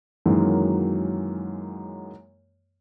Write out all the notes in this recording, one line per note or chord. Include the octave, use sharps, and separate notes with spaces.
F#2 D#3 E3 F#3 G#3 A#3